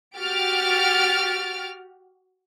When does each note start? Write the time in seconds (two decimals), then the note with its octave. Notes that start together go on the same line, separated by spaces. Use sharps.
0.16 F#4 G4 F6 A6 D7